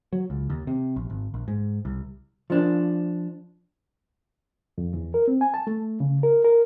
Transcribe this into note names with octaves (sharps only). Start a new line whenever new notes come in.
F#3
C#2
D#2
C3
A#1
G#1
A#1
G#2
C2
F3 D4
F2
E2
A#4
C4
G#5
A5
A3
C#3
A#4
A#4